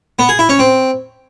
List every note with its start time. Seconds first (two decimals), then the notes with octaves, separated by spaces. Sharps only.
0.19 B3
0.29 G#4
0.39 E4
0.49 C#4
0.59 C4